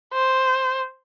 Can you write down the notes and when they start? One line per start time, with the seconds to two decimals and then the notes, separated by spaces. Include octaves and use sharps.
0.13 C5